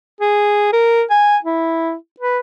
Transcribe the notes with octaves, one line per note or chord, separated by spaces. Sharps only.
G#4
A#4
G#5
E4
B4